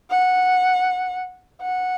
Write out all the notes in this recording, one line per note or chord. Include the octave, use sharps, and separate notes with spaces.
F#5
F#5